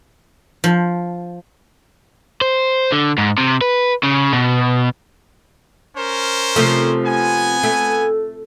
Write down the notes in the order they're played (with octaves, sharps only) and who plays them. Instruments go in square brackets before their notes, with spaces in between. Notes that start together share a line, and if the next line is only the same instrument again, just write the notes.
[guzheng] F3
[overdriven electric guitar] C5
D3
G#2
C3
B4
C#3
B2
[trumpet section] C#4 A#4 C5
[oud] C3 F3 A3
[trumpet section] B3 G#5
[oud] A3